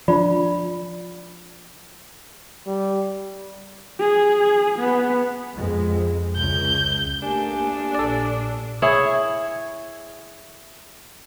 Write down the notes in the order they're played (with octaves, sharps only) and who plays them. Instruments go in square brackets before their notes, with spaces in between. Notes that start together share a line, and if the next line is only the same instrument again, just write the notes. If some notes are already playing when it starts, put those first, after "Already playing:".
[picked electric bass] F3 D4 [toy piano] F4 D5 B5
[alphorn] G3
[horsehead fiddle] G#4
B3
[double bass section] F2 G#3
[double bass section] C#2 [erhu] G6
[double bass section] A3 A#3 [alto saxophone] D4 [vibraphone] G4 G#5
[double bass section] A#1 A#2 [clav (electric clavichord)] A4 D5
[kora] E4 G#4 C#5